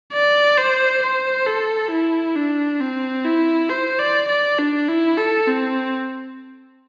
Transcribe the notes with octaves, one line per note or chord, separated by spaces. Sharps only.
D5
C5
C5
A4
E4
D4
C4
E4
C5
D5
D5
D4
E4
A4
C4